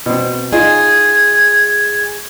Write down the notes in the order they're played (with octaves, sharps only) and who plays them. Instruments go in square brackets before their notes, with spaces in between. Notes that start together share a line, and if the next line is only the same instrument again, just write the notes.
[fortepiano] B2 C4
[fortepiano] D#4 F4 [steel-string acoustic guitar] G#4 [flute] G#6